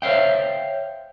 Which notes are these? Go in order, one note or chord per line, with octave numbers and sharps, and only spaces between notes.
C5 C#5 E5 F5 G5